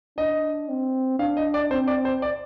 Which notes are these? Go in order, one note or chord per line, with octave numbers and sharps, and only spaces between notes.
D4 D#5
C4
D4 F5
D#5
D5
C4 C5
D5
C5
D5